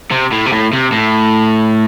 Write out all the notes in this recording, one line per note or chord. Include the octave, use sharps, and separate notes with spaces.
C3
A2
C3
A2
C3
A2